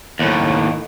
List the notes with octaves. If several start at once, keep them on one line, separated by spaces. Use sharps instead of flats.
D#2 A2